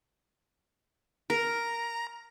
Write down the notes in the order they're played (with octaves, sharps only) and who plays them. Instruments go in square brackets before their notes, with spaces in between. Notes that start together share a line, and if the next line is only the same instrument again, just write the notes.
[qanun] A#4 [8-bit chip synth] A#5